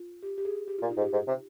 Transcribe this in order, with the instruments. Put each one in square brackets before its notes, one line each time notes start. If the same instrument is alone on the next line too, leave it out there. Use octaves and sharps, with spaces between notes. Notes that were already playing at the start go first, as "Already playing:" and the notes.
Already playing: [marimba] F4
G4
G4
G#4
G4
[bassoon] A#2 [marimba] F4
[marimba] D#4
[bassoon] G#2
[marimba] G4
[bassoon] G#2
C3